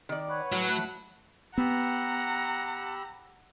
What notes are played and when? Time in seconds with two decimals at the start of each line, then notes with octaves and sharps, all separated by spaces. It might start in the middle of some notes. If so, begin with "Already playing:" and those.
0.09 D#3 D5
0.29 B4 C#5 F#5
0.52 A2 F#3
0.69 A3 B5 F#6
1.58 B3 G4 F#5 A#5 B5 E6